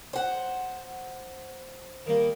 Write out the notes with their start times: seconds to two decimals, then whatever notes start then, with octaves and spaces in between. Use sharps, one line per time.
0.13 C5 F#5
2.06 D#3 G3 A#3